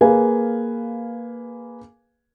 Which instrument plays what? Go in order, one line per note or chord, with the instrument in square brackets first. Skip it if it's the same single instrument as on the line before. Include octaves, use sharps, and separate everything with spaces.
[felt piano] A#3 G#4 B4 F5 G#5